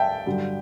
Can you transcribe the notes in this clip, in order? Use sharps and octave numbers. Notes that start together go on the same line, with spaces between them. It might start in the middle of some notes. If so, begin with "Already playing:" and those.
Already playing: E5 G5 A5
G2 D3 F#3